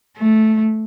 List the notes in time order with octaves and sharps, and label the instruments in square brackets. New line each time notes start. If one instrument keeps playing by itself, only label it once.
[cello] A3